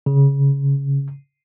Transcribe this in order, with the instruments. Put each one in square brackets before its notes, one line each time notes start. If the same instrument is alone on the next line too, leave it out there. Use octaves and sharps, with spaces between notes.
[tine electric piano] C#3